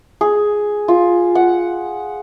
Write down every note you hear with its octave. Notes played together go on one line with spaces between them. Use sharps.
G#4
F4
F#5